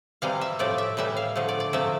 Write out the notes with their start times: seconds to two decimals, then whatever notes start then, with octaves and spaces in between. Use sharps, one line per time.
0.22 C3 E3 G3 F5
0.41 E5
0.59 A2 F3 A3 D5
0.78 E5
0.97 A2 E3 G3 E5
1.17 F5
1.36 D3 F3 A3
1.48 D5
1.60 D5
1.73 C3 F3 A3 E5